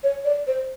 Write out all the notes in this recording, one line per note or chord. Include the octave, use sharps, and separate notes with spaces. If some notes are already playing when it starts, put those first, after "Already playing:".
C#5
D5
C5